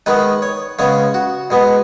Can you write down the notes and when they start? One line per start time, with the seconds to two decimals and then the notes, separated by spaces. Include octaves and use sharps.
0.06 D#3 G#3 B3 B4
0.42 C#5
0.79 C#3 G#3 B3 C#5
1.14 F#4
1.50 B2 G#3 B3